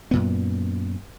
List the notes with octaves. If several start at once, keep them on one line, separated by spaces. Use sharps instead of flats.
F#2 A#2 B3